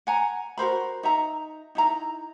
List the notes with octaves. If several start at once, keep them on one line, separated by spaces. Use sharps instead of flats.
F#5 G#5 A#5
F#4 A#4 C5 B5
D#4 E5 A#5
D#4 E4 A#5